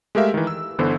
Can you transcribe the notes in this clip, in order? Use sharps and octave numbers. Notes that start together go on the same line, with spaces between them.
G#3 A3 G4 A#4 E5 F5
D#3 E3
E6
G1 D3 E3 B3 E4 C5